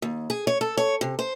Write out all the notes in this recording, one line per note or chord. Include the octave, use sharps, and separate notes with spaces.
D#2
G#4
C#5
A4
C#5
C3
C5